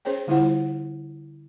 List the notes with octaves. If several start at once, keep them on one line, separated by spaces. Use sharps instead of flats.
C#4 G#4 C5 C#5 G5
D3 G3 E4 F4 C5 F#5